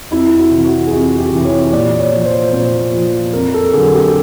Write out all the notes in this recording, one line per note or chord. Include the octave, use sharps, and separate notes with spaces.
F2 E4
F#4
C3 E3
F#4
G#4
F2 G4
G4
C3 E3
C#5
A#2 D5
C#5
F3
C5
A#2 C5
F3
F2 A#4
A4
D3 F#3 G#4
G4